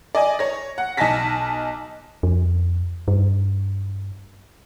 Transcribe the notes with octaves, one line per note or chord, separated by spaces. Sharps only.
D5 D#5 G#5
C#5 A#6
F#5
B1 D#4 G#5 A5 A#6 B6
F2
G2